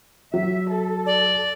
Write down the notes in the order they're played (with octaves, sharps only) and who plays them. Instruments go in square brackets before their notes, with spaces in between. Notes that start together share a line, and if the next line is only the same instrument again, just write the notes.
[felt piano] F#3 [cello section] E5
[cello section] A4
[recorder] D5